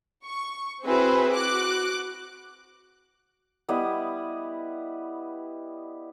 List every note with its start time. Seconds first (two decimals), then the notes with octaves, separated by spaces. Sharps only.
0.24 C#6
0.85 C4 E4 F#4 G#4 B4 C5
1.31 F#4 D6 F#6
3.69 G3 B3 E4 D#5